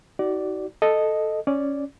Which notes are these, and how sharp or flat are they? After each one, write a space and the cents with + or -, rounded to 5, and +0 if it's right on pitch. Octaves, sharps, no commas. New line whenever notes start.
D#4 +35 F#4 +35 D5 +0
A4 +0 D#5 -5
C#4 +0 D5 -5